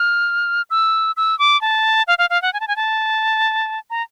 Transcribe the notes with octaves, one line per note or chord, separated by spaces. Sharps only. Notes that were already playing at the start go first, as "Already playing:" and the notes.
Already playing: F6
E6
E6
D6
A5
F5
F5
F5
F#5
G#5
A5
G#5
A5
A#5